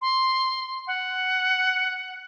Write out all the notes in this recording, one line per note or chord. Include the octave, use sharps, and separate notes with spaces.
C6
F#5